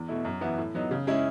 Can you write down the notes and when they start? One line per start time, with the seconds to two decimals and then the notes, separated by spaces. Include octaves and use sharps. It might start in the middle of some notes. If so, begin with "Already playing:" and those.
Already playing: E2
0.08 B2 A3 E4
0.25 F#2
0.41 E3 B3 E4
0.58 A2
0.74 F#3 B3 D#4
0.91 C#3
1.07 G#3 C#4 E4